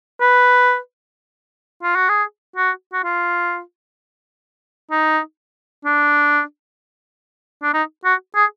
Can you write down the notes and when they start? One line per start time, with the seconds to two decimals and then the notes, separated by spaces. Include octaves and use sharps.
0.21 B4
1.83 F4
1.95 F#4
2.09 G#4
2.56 F#4
2.93 F#4
3.04 F4
4.91 D#4
5.85 D4
7.63 D4
7.73 D#4
8.05 F#4
8.35 G#4